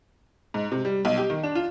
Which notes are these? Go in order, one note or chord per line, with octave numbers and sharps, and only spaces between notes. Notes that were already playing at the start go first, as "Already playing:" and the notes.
G#2
C3
G3
B1
G4
D#3
D4
F4